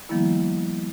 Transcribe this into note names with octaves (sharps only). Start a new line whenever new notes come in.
D#3 F3 G3 A#3 B3 E4